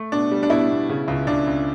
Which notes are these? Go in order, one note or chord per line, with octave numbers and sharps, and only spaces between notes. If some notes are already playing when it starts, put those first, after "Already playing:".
Already playing: A3
B2 D4
G3
D4
B2 E4
B2
C#3
C#2
C#2 D4
C#2